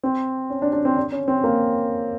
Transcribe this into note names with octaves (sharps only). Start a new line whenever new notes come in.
C4
C#4
D4
D4
C4
D4
C#4
C4
A#3